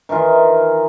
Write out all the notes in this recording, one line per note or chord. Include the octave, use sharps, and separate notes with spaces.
D#3 E3 D#4 F4